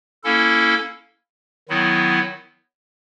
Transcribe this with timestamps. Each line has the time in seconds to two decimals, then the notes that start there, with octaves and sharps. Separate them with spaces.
0.24 A#3 C#4 E4 A4
1.69 D#3 F#3 B3 E4